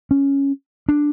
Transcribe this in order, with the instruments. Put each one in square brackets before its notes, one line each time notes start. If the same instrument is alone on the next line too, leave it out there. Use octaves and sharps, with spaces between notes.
[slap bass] C#4
D4